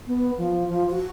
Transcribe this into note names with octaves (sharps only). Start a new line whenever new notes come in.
B3
F3
F3
F#4